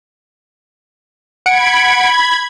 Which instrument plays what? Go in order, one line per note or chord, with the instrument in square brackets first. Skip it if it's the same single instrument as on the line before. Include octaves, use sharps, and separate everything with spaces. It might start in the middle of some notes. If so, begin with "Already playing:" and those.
[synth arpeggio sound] F#5 C#7 D7 [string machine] B5 G#6